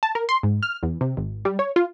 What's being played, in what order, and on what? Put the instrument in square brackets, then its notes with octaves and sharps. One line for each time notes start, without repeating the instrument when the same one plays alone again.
[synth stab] A5
A#4
C6
G#2
F6
E2
C3
G#1
G3
C#5
F4